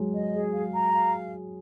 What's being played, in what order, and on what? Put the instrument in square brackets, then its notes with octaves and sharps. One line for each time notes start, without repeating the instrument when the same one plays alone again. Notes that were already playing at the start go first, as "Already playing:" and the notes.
Already playing: [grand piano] F#3 G#3
[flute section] D#5
G#4
F5
A#5
F5